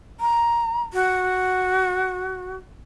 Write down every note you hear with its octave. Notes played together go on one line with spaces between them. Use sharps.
A#5
F#4